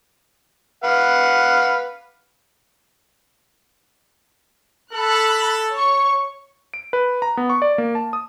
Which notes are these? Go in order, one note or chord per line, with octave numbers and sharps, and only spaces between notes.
B4 F5 F#5
A4 B5 F#6
C#5 C#6
D7
B4
A#5
B3
C#6
D5
A#3
A5
D#6